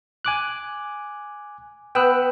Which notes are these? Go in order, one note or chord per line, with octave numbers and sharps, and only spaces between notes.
G#5 D6 F#6
B3 G5 E6 F#6